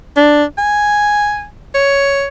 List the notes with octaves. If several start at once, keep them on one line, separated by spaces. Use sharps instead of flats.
D4
G#5
C#5